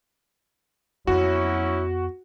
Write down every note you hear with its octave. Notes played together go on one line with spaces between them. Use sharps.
F2 F#3 B3 C#4 E4 F#4